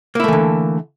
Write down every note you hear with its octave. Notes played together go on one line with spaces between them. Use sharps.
D3 E3 A3 A#3 E4